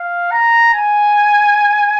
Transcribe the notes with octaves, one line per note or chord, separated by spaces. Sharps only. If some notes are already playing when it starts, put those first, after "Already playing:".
Already playing: F5
A#5
G#5